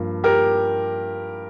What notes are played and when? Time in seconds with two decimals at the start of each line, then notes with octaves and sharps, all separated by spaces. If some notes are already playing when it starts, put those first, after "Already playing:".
Already playing: G2 F3 A#3
0.24 G4 A#4